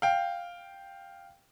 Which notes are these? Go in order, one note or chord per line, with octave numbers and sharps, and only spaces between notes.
F5 G5